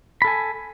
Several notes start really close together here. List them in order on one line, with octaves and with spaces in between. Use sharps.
B5 A4 G#5